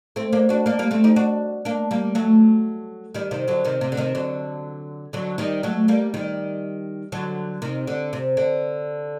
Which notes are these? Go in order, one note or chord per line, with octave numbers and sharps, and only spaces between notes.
A3 C4
A#3 D4
D4 F#4
A#3 D4
G3 A#3
A3 C4
D#4 G4
D4 F#4
A#3 D4
G3 A#3
F#3 A3
D#3 G3
C3 D#3
D3 F#3
C3 D#3
C3
D3
C3 D#3
D3 F#3
D3 F#3
D#3 G3
F#3 A3
G3 A#3
D#3 G3
D3 F#3
C3 D#3
D3
C3
D3